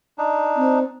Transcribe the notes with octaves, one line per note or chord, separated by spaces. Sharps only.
D4 D#4
C4